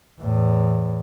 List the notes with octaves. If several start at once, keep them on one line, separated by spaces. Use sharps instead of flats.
E2 A2